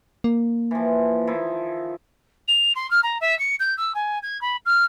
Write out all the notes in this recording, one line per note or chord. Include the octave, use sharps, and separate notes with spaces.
A#3
E3 F3
D#3 F3 E4
F7
C6
F6
A#5
E5
C#7
G6
E6
G#5
G#6
B5
F6